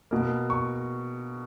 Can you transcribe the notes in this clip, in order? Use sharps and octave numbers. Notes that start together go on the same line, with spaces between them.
B2 A#3
C#6